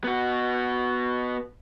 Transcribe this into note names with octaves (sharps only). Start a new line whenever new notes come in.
B3 F#4